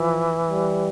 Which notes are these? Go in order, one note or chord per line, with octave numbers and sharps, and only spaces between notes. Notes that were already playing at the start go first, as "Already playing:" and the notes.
Already playing: E3 F3
G3